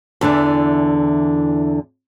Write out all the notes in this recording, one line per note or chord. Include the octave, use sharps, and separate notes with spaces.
E2 D3 E3 D4